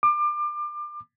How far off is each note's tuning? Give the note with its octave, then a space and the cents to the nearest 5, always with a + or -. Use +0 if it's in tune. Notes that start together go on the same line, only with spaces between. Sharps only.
D6 +30